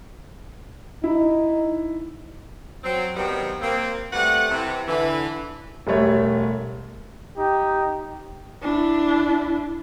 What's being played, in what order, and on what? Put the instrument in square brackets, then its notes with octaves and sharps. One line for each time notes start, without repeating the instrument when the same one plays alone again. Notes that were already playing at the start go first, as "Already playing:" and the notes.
[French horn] D#4 [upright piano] E4
[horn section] F#3 C4
C3 D#3 F#3 G3 B3 C4
A#3 C4
G3 A3 C4 B4 F#5
C3 E3
D3 E3
[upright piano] E1 G3 A3 C#5
[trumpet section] D#4 G4
[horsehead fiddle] D4 E4